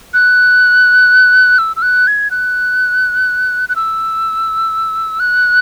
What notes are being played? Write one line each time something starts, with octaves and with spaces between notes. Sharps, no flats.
F#6
E6
E6
F#6
G#6
F#6
F#6
E6
F#6